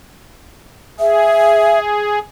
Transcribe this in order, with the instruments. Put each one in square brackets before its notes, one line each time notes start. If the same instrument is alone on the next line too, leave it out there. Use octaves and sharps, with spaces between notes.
[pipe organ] G#4 [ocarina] E5